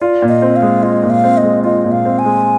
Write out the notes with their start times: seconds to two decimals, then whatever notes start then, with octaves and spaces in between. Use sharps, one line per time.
0.01 F4 D5
0.22 A#2
0.28 D#5
0.42 C4
0.56 F5
0.62 G#3
0.83 F4 D#5
1.03 A#2
1.10 F5
1.24 C4
1.37 D#5
1.43 G#3
1.64 F4 D#5
1.85 A#2
1.91 F5
2.05 C4
2.19 G#5
2.25 G#3